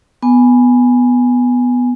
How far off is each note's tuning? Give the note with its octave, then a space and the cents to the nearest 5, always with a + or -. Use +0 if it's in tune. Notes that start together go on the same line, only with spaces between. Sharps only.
B3 +0 G#5 +0